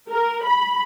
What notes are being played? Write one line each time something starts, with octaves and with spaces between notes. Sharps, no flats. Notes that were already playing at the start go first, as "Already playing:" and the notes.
A#4
B5